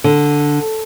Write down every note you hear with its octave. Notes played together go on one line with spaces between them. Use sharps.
D3